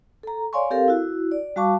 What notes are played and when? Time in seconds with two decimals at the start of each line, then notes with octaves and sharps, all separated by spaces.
0.23 A4 A#5
0.53 C#5 D5 F5 G#5 C6 C#6
0.70 C4 G4 A4 A#4 F5
0.88 E4 F#4
1.32 D5
1.56 G3 F#4 F5 A5 C#6 D6